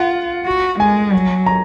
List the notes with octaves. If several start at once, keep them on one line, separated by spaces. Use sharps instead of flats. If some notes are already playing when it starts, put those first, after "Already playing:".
Already playing: F4 F#5
F#4
G#3 G#5
F#3
A#5